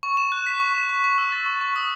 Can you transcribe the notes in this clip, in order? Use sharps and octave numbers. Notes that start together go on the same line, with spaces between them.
C#6
E7
F#6
B6
C#6
E7
C#6
C#6
E6
A6
C#6
C#6
D#6